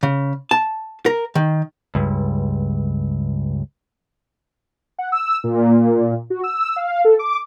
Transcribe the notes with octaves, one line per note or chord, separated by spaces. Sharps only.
C#3
A5
A#4
D#3
C#2 G2
F#5
E6
A#2
F#4
E6
F5
A4
D6